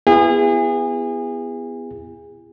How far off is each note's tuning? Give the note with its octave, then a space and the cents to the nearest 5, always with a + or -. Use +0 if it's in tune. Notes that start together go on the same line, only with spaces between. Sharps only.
B3 +10 E4 +30 G#4 -30